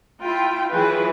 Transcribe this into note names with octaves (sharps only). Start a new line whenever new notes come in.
E4 F4 G5
E3 F#3 E4 F4 G#4 B4